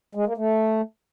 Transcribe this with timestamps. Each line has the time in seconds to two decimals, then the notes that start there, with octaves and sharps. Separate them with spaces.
0.15 G#3
0.26 A#3
0.37 A3